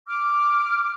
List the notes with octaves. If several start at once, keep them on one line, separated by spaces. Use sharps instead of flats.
D6 F6